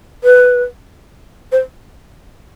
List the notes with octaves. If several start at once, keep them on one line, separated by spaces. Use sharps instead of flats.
B4
C5